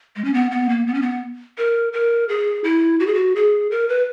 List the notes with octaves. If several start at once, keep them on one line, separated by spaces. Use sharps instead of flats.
G#3
C#4
B3
B3
A#3
B3
C#4
B3
A#4
A#4
G#4
E4
F#4
G#4
F#4
G#4
A#4
B4